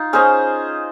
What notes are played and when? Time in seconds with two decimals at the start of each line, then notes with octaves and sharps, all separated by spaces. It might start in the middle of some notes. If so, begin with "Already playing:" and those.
Already playing: D#4 F4
0.13 C#4 G#4 C5 D#5